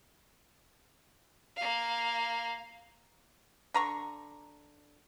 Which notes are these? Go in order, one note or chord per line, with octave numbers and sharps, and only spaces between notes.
A#3 F5
D3 A#5 C#6